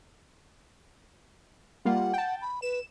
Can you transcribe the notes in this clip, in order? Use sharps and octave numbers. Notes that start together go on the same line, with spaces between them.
G3 A#3 F4 F#5
G5 A5
B5
B4 E7